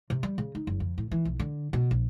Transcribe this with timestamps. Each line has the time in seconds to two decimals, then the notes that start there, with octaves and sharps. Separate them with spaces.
0.10 C3
0.23 G3
0.38 C#3
0.55 D#4
0.67 F#1
0.80 F2
0.98 A2
1.11 E3
1.25 B1
1.39 D3
1.73 B2
1.91 A#1